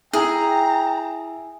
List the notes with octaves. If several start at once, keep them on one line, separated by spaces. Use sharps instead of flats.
E4 G#4 G5 A#5